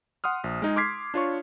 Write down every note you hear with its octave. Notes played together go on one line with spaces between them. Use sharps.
F#5 C6 D#6 F6
A#1
G#3 D#4 G#4
C6 D6 F6 G#6 B6 C7
D4 F4 C#5 C#6